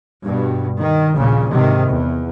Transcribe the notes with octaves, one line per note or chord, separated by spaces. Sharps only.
G2 B2
D#3
A#1 D#2 A#2 C#3
G#2 C3 D#3
E2